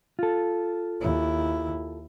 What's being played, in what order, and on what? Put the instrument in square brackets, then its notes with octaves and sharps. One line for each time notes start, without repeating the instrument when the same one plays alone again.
[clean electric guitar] F4 A4
[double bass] D#2 E4